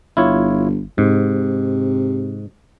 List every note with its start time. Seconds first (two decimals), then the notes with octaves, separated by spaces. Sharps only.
0.17 G1 E4 F4 C#5
0.98 G#2 C3